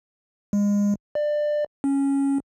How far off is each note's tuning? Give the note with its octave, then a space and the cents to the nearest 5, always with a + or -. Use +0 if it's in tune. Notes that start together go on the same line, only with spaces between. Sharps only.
G#3 -30
D5 +20
C#4 -5